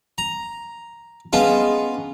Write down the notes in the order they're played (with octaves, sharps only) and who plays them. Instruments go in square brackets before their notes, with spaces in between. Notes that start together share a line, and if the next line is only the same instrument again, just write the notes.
[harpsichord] A#5
[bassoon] G#3 [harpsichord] B3 F4 [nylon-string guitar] C#4 A5